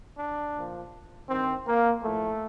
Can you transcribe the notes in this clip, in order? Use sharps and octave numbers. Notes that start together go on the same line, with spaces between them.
D4
A#2 F3
G2 D#3 C4
A#3
A2 F3 A3